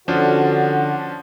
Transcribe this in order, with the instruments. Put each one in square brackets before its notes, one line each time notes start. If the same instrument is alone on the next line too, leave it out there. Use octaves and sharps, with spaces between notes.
[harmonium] D3 F#4 [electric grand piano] F3 C#4 D4